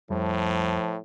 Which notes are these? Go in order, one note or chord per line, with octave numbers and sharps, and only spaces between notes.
F2 A2 F3 G3